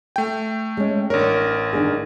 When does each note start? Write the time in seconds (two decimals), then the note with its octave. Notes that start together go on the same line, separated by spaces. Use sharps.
0.16 A3 G5
0.77 G#3 C#4
1.10 A1 D4 A#4 C#5
1.73 D#3 D4 G#4